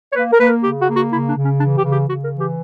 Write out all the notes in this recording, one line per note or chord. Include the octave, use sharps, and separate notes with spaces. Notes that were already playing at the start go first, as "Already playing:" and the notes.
C#5
A#3 B4
A#4
A#3 B4
A#4
C#3 G4
F#4
A#3
F#4
C#3 E4
D4
C#3
C#4
E3 D4
G4
C#3
G4
C#3 F#4
A#4
E3
G4